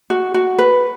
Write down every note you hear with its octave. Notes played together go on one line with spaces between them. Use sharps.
F#4
F#4
B4